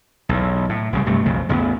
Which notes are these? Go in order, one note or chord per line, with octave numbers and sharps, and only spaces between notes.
B1 E2
A2
C2 C#3 G3
G2 C3 A3
B1 F2 C#3
A1 E2 C#3 B3